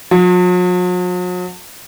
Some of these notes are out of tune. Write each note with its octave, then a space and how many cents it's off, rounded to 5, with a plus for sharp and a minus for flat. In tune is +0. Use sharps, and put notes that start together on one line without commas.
F#3 -45